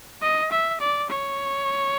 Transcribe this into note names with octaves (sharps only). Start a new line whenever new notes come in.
D#5
E5
D5
C#5